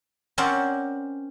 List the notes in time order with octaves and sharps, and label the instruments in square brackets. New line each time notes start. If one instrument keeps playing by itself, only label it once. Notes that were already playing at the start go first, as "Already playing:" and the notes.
[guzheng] C4 C#4 A#4 C5 D5 F#5